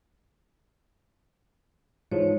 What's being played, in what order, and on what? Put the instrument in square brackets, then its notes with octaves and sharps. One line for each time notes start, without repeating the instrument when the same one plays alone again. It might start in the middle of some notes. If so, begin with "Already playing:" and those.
[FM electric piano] G#2 E3 F3 [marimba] C#5